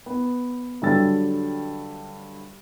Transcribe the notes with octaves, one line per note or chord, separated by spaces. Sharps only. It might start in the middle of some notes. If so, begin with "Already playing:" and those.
B3
G2 D3 F#3 G3 E6 A6